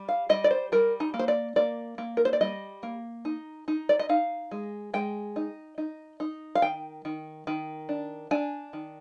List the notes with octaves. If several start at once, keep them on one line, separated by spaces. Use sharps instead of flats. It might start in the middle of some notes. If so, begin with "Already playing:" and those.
Already playing: G3
F5
G3 D#5
D5
C5
G3 A#4
D#4
A#3
C5
D5
A#3 D5
A#3
A#4
C5
D5
G3 D#5
A#3
D#4
D#4
D5
D#5
D#4 F5
G#3
G#3 G5
D#4
D#4
D#4
F5
D#3 G5
D#3
D#3
D4
D4 G#5
D#3